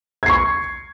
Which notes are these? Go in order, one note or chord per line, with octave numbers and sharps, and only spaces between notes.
C#6 G#6 C7